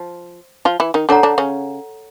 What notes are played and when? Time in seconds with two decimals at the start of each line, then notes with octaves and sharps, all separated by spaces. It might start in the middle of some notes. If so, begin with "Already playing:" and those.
Already playing: F3
0.65 F3 F4
0.80 E3 E4
0.94 D#3 D#4
1.09 D3 D4 A4 C#5 F#5 A#5
1.23 D3 D4
1.38 C#3 C#4